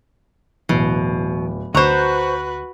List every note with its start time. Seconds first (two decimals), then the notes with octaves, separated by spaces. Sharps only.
0.69 D1 B2 E3
1.75 D2 F#4 B4 C5 A#5 C#6 F#6